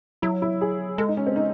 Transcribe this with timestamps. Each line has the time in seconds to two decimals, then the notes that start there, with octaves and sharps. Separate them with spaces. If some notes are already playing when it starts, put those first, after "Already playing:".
0.22 F#3 E4
0.42 E4
0.61 G#4
0.98 G#3 A4
1.08 D#4
1.17 C#4
1.27 C4
1.36 D#4